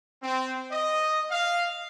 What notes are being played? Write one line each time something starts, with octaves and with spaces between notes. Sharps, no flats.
C4
D#5
F5